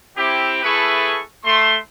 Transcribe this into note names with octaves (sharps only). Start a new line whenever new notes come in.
C4 E4 G4
A3 E4 G#4 A4 B4 C#6
A3 C6